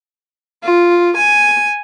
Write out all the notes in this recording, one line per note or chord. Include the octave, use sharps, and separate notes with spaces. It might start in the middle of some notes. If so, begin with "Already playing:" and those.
F4
G#5